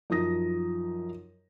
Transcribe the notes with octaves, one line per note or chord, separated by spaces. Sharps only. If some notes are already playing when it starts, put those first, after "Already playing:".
F#2 F3 D#4 D#6 A#6